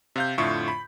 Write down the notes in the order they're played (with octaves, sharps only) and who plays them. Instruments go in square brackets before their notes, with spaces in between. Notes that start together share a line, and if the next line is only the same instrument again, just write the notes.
[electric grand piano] C3 F5 G6
F2 A2 D3 F4 E5 C#6
B5